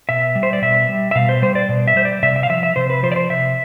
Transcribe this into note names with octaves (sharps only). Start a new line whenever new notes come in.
B2 E5
G3
C5
D5
B2 E5
G3
E5
B2 F5
C5
G3 C5
D5
B2
E5
G3 C5
D5
C3 E5
E5
F5
F3 E5
E5
C3 C5
B4
F3 C5
D5
C5
C3 E5